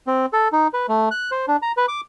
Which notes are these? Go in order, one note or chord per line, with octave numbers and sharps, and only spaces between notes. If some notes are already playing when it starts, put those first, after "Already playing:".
C4
A4
D#4
B4
A3
F#6
C5
D4
A#5
B4
D6